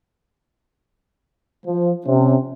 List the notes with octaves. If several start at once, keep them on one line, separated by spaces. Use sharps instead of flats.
F3
C3 C#4